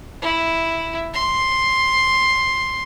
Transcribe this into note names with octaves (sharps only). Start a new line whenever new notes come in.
E4
C6